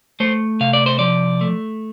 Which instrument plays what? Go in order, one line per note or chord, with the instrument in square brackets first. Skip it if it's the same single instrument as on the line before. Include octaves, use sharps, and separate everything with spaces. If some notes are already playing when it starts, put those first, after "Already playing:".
[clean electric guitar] A3 C5
C3 F5
D5
C5
F3 D5
A3